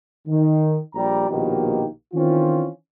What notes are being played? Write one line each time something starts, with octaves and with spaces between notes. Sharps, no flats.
D#3
A#1 G3 G4 D5 A#5
A#1 B2 D#3 A#3 D#4 G4
D#3 E3 C4 C#4 F4